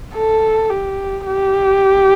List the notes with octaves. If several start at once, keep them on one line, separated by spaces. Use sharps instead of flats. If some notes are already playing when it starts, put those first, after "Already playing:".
A4
G4
G4